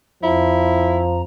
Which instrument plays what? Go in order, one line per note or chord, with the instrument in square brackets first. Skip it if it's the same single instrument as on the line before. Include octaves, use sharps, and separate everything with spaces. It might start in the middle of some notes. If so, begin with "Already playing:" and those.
[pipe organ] F2 A#5 [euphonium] F3 [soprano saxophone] E4